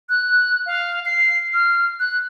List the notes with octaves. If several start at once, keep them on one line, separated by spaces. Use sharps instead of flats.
F#6
F5
C7
F6
F#6